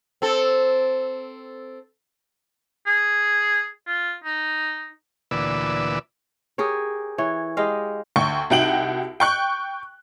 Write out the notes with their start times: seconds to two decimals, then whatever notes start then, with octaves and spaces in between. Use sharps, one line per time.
0.22 C4 A4
2.86 G#4
3.87 F4
4.24 D#4
5.31 D2 A#2 E3 B4 D5 E6
6.58 G4 G#4 A#4 C#5
7.18 E3 C#5
7.57 G#3 G4 D#5 F5
8.16 D2 G5 C#6
8.50 C2 D#4 F#4 G5 D7 F#7
9.20 G5 C#6 F#6